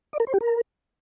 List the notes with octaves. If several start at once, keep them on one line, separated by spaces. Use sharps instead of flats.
D5
A#4
C5
G4
A#4